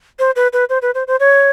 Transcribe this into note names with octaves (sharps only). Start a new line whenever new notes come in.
C5
B4
B4
C5
B4
C5
C5
C#5